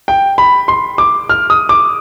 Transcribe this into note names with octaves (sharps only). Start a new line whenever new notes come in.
G5
B5
C6
D6
F6
D#6
D6